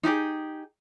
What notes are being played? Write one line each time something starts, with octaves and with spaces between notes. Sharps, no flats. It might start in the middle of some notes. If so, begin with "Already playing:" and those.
D#4 E4 G4 G#4